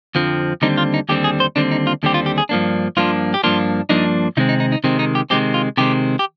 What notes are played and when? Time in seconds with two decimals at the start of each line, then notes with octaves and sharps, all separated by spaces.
0.15 F2 D3 F3 C4
0.62 D#2 D3 G3 C4 D#4
0.78 F4
0.94 D#4
1.09 D#2 D3 G3 C4 G4
1.24 G#4
1.40 C5
1.56 D#2 D3 G3 C4 D4
1.71 D#4
1.87 F4
2.03 D#2 D3 G3 C4 G4
2.14 F4
2.26 G4
2.38 G#4
2.49 G2 F3 A#3 D4
2.97 G2 F3 A#3 D4 F4
3.34 G4
3.43 G2 F3 A#3 D4 F4
3.89 G2 F3 A#3 D4 D#4
4.37 C3 D#3 G#3 C4 D#4
4.49 D#4
4.60 D#4
4.72 D#4
4.84 C3 D#3 G#3 C4
4.99 D#4
5.15 G4
5.30 C3 D#3 G#3 C4 G4
5.54 F4
5.77 C3 D#3 G#3 C4 G4
6.19 G4